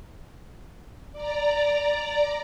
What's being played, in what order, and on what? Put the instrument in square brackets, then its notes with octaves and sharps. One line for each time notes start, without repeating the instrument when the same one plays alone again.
[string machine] D5 A#5